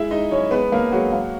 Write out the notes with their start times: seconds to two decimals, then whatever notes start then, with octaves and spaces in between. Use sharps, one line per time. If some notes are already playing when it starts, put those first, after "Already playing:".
Already playing: G#3 E4 E5
0.10 G#3 D#4 D#5
0.31 F#2 C#4 C#5
0.51 G#3 B3 B4
0.72 A#3 C#4 A#4
0.92 F#3 G#3 F#4
1.12 A#3